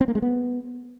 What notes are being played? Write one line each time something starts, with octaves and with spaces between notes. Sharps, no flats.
C4
A#3
G#3
B3